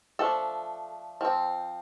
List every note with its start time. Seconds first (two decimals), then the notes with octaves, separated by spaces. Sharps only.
0.19 F3 A3 D4 A4
1.21 F3 C4